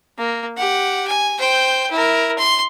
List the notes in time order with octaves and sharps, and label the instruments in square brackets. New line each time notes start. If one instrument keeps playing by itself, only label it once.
[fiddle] A#3
G4 F#5
G#5
C5 G5
E4 A#4
C6